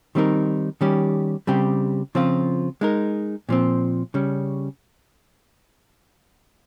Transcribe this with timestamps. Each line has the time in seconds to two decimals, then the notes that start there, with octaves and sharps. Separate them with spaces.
0.15 D#3 G3 C4 D#4 A#4
0.81 D#3 G3 C#4 G4
1.47 C#3 G3 C4 G4
2.15 C#3 F3 C4 F4
2.81 G#3 D#4 A#4
3.49 A#2 F3 C4
4.14 C#3 G3 C#4